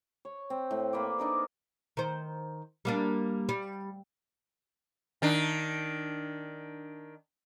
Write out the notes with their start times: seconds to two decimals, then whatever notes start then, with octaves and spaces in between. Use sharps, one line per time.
0.25 C#5
0.50 C4
0.71 A2
0.93 A#3 B4 C5 D5
1.19 D4 D#4 A#4 D5
1.97 D#3 C5
2.85 G3 A#3 D4
3.49 G3
5.22 D#3 D4